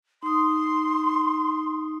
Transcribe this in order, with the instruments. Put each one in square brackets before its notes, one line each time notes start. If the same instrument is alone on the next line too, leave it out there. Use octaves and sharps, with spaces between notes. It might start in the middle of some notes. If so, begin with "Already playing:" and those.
[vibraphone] D#4 D#6 [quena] C6